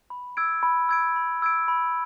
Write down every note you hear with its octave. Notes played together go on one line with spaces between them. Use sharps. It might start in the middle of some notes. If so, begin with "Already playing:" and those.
B5
E6 G#6 D7
B5
E6 G#6 D7
B5
E6 G#6 D7
B5